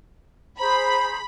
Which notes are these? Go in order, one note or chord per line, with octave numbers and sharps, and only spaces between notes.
G#4 C5 A#5 B5